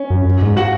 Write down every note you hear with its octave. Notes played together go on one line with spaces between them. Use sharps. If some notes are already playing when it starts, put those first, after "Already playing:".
Already playing: C#4
F#2
F#2
G#2
F#4 F#5